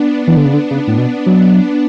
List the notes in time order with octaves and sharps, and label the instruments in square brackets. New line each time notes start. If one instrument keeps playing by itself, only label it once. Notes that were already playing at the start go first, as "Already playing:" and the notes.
Already playing: [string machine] B3 D4
[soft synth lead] E3
D3
C#3
D3
C#3
A2
B2
F#3